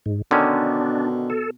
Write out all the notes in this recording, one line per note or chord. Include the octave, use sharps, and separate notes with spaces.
G#2
B2 D3 D#3 C#4 D4
A4